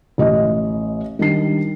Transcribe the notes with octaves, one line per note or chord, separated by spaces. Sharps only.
A1 D#5
D#3 G3 D4 C7